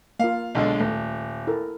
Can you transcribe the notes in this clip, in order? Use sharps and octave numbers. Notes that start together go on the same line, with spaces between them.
A#3 F4 F5
B1 D3 G#3
D#1 A3
E4 A4 A#4